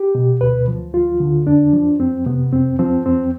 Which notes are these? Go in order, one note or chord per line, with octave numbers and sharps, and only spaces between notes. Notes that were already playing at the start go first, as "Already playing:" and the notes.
Already playing: G4
B2
D2 B4
F3
D2 F4
D3
F2 D4
F3
F2 C4
C3 B3
F2 C4
F3 C4
F2 C4